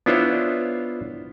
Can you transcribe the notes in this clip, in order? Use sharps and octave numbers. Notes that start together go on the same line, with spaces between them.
B3 D4 E4 F4 C5 C#5